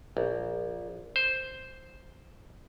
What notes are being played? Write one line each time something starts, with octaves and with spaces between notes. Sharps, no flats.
A#1
C5